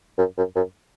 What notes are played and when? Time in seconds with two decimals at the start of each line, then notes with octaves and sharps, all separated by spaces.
0.18 F#2
0.38 F#2
0.56 F#2